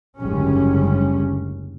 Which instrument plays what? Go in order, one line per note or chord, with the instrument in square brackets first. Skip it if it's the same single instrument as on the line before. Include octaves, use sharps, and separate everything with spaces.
[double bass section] F#1 D2 G#2 G3 C#4